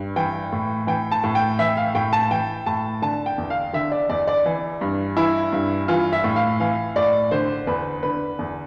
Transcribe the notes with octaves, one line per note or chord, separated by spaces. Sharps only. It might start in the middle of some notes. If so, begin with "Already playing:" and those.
Already playing: G2
E3 G5
A2
E3 G5
A5
A2
G5
E3 E5
F5
A2 G5
A5
E3 G5
A2 A5
D3 A5
G5
E2
F5
D3 E5
D5
E2 D5
D5
E3
G2
E3 E4
G2
E3 F4
E5
A2
F5
E3 F5
A2 D5
D3 C5
E2 B4
D3 B4
E2